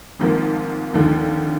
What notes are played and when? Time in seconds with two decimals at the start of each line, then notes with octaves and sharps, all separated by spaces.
0.19 G#1 G#2 F3 A#3
0.94 D#2 D3 F3